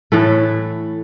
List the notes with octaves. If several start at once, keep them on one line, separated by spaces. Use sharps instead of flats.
A2 E3 A3 A4